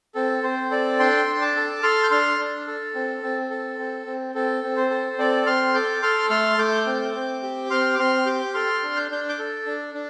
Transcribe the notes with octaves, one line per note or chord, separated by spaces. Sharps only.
C4 A4
C4 C5
A4 D5
D4 G5 C6
D4
A5 D6
A4
A4 C6 F6
G6
D4 C6 F6
D4
A4
C4
C4
A4
C4
C4
C4 A4
C4
C5
A4
C4 A4 D5
C4 C6 F6
A4 D6 G6
A4 C6 F6
A3 C6 F6
A3 D6 G6
C4
C4
G4
C4 C6 F6
D6
C4 C6 F6
G4 D6 G6
A4 C6 F6
D4
G6
D4 G6
D6 G6
A4
D4
D4